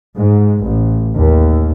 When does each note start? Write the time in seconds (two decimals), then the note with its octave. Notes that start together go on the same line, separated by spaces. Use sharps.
0.17 G#2
0.63 A1
1.15 D#2